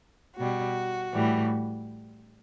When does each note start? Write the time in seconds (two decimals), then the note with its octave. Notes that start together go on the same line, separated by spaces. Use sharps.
0.36 B2 G3 F#4
1.13 A2 E3 G3